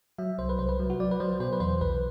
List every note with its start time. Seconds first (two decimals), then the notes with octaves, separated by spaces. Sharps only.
0.18 F#3 E5
0.38 C2 C5
0.49 B4
0.59 C2 C5
0.69 B4
0.79 F#3
0.90 F#4
1.00 F#3 D5
1.11 B4
1.20 F#3 C5
1.40 B2 C5
1.53 B4
1.60 E2 C5
1.81 B1 B4